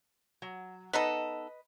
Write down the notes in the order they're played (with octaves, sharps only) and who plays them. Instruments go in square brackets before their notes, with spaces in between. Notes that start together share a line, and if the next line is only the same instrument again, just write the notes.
[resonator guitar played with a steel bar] F#3
[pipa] B3 D#4 A4 [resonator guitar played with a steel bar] B4 D#5